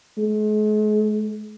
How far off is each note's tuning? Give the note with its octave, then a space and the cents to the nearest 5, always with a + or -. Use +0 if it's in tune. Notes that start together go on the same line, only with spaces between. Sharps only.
G#3 +45